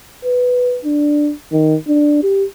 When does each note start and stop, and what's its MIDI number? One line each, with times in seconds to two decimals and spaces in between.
0.25 0.79 71
0.85 1.32 62
1.52 1.75 51
1.88 2.21 62
2.23 2.44 67